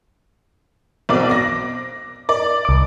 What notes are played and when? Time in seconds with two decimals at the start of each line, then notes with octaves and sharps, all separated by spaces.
1.09 B1 C4 D5
1.29 D6 A#6
2.29 D5
2.65 C2 D6